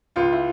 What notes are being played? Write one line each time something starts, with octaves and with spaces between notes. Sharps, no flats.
C#2 F4
E4